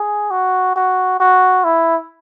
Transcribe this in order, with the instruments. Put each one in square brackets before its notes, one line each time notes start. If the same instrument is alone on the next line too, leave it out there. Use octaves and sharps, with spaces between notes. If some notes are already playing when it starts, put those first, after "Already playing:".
Already playing: [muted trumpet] G#4
F#4
F#4
F#4
E4